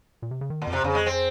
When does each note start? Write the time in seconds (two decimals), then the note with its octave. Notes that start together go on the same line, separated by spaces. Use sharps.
0.22 A#2
0.31 C3
0.41 C#3
0.50 D#3
0.62 A#2
0.67 F2
0.73 C3
0.84 F2 C#3
0.95 G#3
1.06 C4